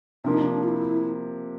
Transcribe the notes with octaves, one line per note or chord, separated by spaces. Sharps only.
C3 F3 A#3 D4
D#4
D4
F4
E4